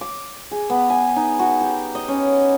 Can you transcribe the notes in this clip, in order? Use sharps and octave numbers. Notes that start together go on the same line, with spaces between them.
D6
G#4
B3
G#5
D#4
F#4
G4
D#5
C#4